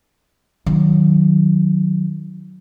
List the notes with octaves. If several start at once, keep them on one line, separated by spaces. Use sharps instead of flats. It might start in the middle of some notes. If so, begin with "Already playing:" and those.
D#3 F#3